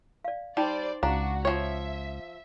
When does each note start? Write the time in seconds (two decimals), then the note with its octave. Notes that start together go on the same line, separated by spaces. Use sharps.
0.25 D5 F5
0.57 G3 D#4 C5 D5
1.03 C#2 D4 F#4 F5 A#5
1.45 F3 C#5 E5